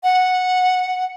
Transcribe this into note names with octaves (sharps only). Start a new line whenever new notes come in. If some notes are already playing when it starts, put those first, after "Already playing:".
F#5